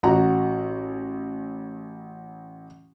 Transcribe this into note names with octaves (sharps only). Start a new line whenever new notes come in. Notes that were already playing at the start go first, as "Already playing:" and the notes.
A1 F#4 F#5 A#5